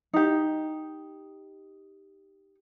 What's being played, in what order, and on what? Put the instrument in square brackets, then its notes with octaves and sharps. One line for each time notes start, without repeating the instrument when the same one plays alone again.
[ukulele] D#4 G4